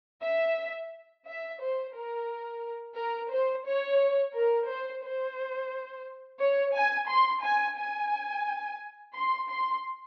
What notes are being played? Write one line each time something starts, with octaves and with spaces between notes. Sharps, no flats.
E5
E5
C5
A#4
A#4
C5
C#5
A#4
C5
C5
C#5
G#5
C6
G#5
G#5
C6
C6